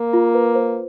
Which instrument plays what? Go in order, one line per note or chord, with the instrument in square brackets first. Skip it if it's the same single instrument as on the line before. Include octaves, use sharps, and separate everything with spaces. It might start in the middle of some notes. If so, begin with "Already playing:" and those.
Already playing: [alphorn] A#3
[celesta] F4
B4
C5